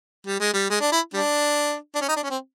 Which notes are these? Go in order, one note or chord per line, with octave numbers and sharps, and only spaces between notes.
G3
G#3
G3
G#3
D4
E4
G3 D4
D4
C#4
D#4
D4
C#4
C4